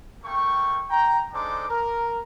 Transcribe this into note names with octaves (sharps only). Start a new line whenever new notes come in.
A3 A#3 G5 C#6
G5 A#5
G#3 D4 D#4 A4 C5 D6
A#4